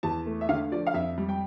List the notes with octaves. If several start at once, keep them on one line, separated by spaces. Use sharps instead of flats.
E2 A5
A3
E5
D3 F5
F3 D5
F5
F2 E5
G3
G5